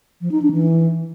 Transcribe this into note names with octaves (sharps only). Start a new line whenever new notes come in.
F3
D#4
D4
E3